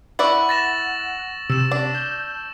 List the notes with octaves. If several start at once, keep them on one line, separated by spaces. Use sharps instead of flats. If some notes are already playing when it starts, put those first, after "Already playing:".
E4 B4 D5 F#5 C#6 E6 F#7
A6 A#6 E7
C3 E6 E7
D4
G6